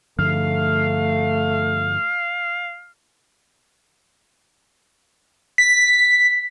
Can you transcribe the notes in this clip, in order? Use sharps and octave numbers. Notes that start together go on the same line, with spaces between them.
G2 D3 F3 A3 F5
B6